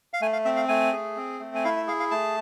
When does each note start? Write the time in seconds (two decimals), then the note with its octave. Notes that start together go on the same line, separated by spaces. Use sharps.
0.13 F5
0.21 A3 G#5
0.33 F5
0.45 C4 E5
0.56 F5
0.68 A3 G#5
0.93 G#4
1.17 C4
1.40 A3
1.55 G#5
1.64 E4 F5
1.76 E5
1.87 G#4 F5
2.00 F5
2.11 A3 A5